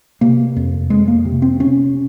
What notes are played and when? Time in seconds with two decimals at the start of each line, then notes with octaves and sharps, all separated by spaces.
0.21 C3 A#3
0.56 F2
0.90 F2 G#3
1.08 A#3
1.25 C3
1.42 C4
1.60 C3 C#4